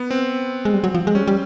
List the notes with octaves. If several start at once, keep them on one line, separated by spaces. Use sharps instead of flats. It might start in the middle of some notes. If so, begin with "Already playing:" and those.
Already playing: B3
C4
G#3
G3
F#3
F3
G#3
G3 C#4
G3